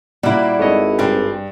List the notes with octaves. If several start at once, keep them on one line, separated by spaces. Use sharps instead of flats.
A#2 G3 A#3 E4 F#4
G#1 A4 C#5 D#5
G2 G3 C4 G#5